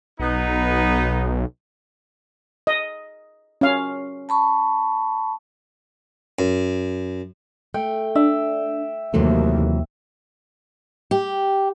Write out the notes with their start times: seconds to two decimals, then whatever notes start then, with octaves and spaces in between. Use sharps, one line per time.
0.20 B1 B3 D#4
2.67 D#5
3.61 C#4 F5
4.29 A5 B5 C#6
6.39 F#2
7.74 A3 G5
8.15 D4 E5
9.14 D#2 C3 E3 F#3 A3
11.11 G4